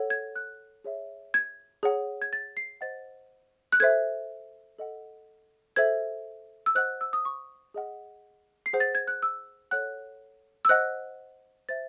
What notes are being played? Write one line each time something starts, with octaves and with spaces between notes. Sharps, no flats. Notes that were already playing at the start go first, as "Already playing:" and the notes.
Already playing: A4 C#5 F#5
G#6
F#6
G#4 C#5 E5
G#6
G#4 C#5 F#5
G#6
A6
C7
C5 D#5 F#5 A6
F#6
A4 C5 E5 G#6
A4 D#5 F#5
A4 C5 E5 G#6
E6
C5 D#5 F#5 F#6
E6
D#6
C#6
G#4 D#5 F#5
C7
G#4 C5 F#5
A6
G#6
F#6
E6
A4 C#5 F#5 F#6
E6
C5 D#5 F#5 F#6
C5 E5 A6